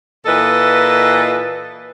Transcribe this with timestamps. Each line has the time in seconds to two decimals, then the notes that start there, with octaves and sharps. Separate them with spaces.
0.26 A#2 E3 A4 B4 D#5